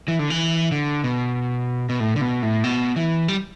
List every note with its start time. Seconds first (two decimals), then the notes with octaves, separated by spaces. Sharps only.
0.08 E3
0.19 D3
0.30 E3
0.72 D3
1.04 B2
1.89 B2
2.00 A2
2.16 D3
2.21 B2
2.43 A2
2.64 B2
2.96 E3
3.28 G3